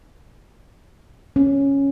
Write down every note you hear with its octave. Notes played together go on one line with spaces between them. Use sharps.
C#4